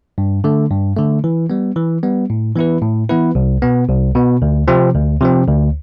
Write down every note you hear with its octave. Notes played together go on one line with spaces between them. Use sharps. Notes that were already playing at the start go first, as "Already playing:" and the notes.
G2
D3 A3
G2
D3 A3
E3
G3 B3
E3
G3 B3
A2
E3 B3 E4 B4
A2
E3 B3 E4 B4
C2
B2 B3
C2
B2 B3
D2
C3 F3 C4
D2
C3 F3 C4
D2